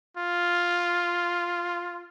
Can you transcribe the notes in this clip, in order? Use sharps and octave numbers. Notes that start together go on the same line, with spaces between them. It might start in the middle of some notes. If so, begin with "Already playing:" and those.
F4